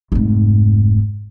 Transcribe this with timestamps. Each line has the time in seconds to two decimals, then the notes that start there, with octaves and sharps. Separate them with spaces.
0.12 F1 G#2